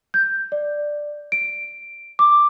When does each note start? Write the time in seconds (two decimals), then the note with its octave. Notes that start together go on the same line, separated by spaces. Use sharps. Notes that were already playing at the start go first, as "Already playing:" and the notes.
0.14 G6
0.52 D5
1.32 D7
2.19 D6